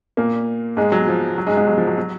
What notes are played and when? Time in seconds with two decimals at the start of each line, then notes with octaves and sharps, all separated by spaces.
0.17 A#2 A#3
0.77 G#2 G#3
0.92 F#3
1.08 F3
1.38 F#3
1.47 G#2 G#3
1.57 G#2 G#3
1.67 F#3
1.78 F3
1.87 F#3
1.98 F#3